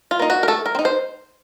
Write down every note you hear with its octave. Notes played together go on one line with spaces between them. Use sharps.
F4
A#3 D#4
F#4
A#4
A3 A4
A#4
C4
D#4
C5